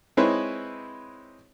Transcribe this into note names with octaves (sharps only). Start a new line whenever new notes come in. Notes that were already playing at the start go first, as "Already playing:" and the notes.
G#3 C4 D#4 E4 B4 C#5